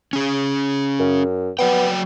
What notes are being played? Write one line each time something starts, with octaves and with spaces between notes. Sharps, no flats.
C#4 G#4
F#2
F#3 B3 D5 G5